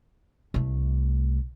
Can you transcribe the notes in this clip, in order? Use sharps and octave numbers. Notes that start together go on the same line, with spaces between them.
C2 A3